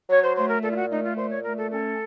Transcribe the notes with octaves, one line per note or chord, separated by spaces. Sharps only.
F#3 C#5
C5
A3 C5
A#4
A#2 A4
F4
F#4
A3 D#4
F4
A#2 C5
C#5
A3 A#4
A4
C#4 A4